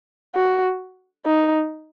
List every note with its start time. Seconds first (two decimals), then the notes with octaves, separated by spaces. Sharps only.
0.35 F#4
1.25 D#4